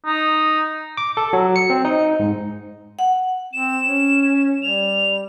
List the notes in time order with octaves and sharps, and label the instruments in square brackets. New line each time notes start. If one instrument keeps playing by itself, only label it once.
[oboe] D#4
[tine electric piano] D6
A4
F#3
C#7
C4
D#4
G#2
[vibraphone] F#5
[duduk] C4 [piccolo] E7
[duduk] C#4
[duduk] G3 [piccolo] F7